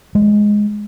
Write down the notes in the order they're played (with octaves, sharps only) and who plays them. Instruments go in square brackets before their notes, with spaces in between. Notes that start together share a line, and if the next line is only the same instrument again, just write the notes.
[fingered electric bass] G#3